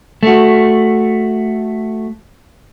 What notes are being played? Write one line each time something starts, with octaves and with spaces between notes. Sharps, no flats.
A3 F#4